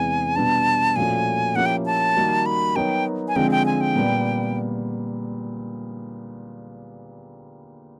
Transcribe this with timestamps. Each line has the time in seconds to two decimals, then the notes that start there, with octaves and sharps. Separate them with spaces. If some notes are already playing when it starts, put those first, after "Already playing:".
Already playing: E2 C3 E3 G#3 G#5
0.36 B2 G3 B3 D4 A5
0.96 A#2 F3 A3 C#4 F#4 G#5
1.56 F3 A#3 C#4 E4 G4 F#5
1.66 G5
1.86 A5
2.16 D#3 G3 A#3 D#4 F#4
2.46 B5
2.76 F#3 B3 D#4 F#4 A#4 G5
3.28 G#5
3.36 D3 F3 G#3 C4 G5
3.51 G5
3.66 G#5
3.81 G5
3.96 A#2 G3 B3